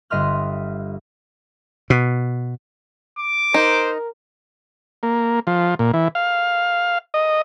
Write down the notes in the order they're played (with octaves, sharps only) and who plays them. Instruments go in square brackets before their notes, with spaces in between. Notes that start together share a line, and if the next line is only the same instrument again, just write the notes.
[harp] G1 D#5 E5 C6 F6 F#6
[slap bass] B2
[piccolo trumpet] D6
[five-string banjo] D#4 [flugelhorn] A#4 [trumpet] C5
[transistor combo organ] A#3
F3
A#2
E3
F5
D#5